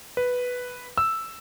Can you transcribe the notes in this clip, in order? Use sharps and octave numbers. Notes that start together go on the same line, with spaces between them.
B4
E6